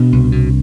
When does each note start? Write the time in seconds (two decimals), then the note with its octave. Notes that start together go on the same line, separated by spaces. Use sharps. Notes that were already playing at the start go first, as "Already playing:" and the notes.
Already playing: B2 D4
0.12 C2
0.32 B2